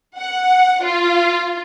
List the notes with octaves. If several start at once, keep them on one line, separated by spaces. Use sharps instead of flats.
F#5
F4